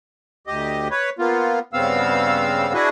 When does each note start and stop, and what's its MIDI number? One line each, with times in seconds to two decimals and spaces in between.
0.47 0.88 38
0.47 0.88 67
0.47 0.88 75
0.91 1.10 71
0.91 1.10 73
1.19 1.59 58
1.19 1.59 59
1.19 1.59 65
1.73 2.73 43
1.73 2.73 49
1.73 2.73 59
1.73 2.73 60
1.73 2.73 77
1.73 2.73 88
2.74 2.89 62
2.74 2.89 64
2.74 2.89 66
2.74 2.89 68
2.74 2.89 71
2.74 2.89 75